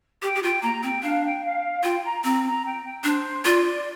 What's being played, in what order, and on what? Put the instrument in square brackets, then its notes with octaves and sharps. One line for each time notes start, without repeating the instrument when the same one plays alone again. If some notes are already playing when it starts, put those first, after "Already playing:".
[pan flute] G4 [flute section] G5
[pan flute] G4
[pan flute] F4 [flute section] G5
[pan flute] A#3 [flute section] A#5
[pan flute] C4 [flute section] G5
[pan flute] D4 [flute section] F5
[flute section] G5
F5
[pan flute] F4 [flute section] G5
[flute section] A#5
[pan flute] C4 [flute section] A#5
[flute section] A#5
G5
G5
[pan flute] D4 [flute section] C5
[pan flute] F4 [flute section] D5